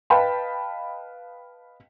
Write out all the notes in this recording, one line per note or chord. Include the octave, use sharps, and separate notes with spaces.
B4 D#5 F5 G5 A5 B5